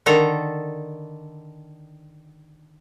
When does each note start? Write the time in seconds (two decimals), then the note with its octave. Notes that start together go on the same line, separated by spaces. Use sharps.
0.06 D3 D#3 A4 A#5